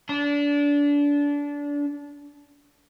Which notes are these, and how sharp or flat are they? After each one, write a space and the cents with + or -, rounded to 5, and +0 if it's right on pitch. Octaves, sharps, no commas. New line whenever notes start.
D4 -25